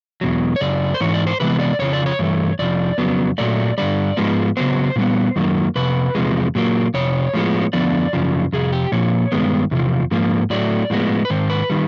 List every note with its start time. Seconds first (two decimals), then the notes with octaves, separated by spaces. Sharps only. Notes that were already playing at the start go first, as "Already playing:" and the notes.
0.21 E2 B2 F#3
0.56 C#5
0.60 F#2 C#3 D5
0.94 C5
1.00 G#2 E3 C#5
1.14 D5
1.27 C5
1.40 C3 E3 G#3 B3 B4
1.60 D5
1.79 F2 C#3 F3 C#5
1.93 D5
2.06 C#5
2.19 G2 E3 A3
2.59 F2 C3 F3 D5
2.98 F2 C#3 F#3 B3
3.38 A#2 F#3 A3 D5
3.78 G2 D3 G3 D5
4.17 G#2 F3 G#3 B3
4.57 C#3 F#3 B3 C5
4.96 A#2 G3 B3
5.36 F#2 D#3 F#3 A#3
5.76 F2 C3 B4
6.15 E2 C3 F3 G#3
6.55 A#2 F#3 A#3
6.94 F2 C3 C#5
7.34 A2 F3 G#3 B3
7.73 F2 D3 F3 B3 D5
8.13 F#2 C#3 F3
8.53 F2 C3 G#4
8.72 G4
8.92 A#2 F3 A#3 C#5
9.32 G2 D#3 G#3 B3
9.71 E2 C3 F3
10.11 G#2 F3 A#3
10.50 A2 F#3 A3 D5
10.90 A2 F3 G#3 B3
11.25 B4
11.30 G#2 D#3 C5
11.50 B4
11.70 D#3 G3